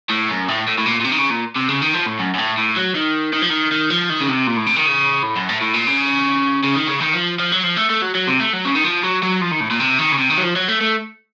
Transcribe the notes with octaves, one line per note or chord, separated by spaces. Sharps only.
A2
F#2
A2
A2
A2
A#2
A#2
C3
D#3
C#3
A#2
C3
C#3
D#3
F3
A2
F#2
F#2
A2
A2
F#3
D#3
D#3
F3
D#3
D#3
F3
D#3
C#3
C3
A#2
A2
C3
D#3
C#3
A2
F#2
A2
A2
A#2
C#3
C#3
D#3
C#3
D#3
F3
F3
F#3
F3
A3
A3
F#3
F#3
C3
A3
F#3
C#3
D#3
F3
F#3
F#3
F3
D#3
A2
A#2
C3
D#3
C#3
C3
D#3
F#3
F3
F#3
A3
A3